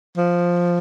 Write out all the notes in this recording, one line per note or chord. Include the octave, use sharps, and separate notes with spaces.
F3